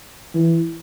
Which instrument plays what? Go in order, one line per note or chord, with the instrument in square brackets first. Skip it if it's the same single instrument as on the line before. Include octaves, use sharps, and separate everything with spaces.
[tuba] E3